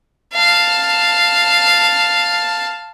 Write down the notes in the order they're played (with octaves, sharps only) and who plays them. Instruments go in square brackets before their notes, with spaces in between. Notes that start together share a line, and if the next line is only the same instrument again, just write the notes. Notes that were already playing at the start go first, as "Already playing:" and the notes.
[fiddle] F5 A5